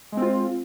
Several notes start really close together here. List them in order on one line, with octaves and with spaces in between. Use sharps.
G#3 C4 F4